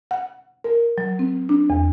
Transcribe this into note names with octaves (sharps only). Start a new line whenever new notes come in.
F#5
A#4
F#3
C4
D4
E2